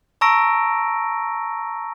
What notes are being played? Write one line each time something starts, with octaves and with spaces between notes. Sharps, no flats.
A5 A#5 C#6 E6 A#6 D7